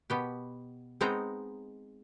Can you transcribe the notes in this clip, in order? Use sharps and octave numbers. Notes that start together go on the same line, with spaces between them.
B2 B3 G4
G#3 B3 C4 D#4 A#5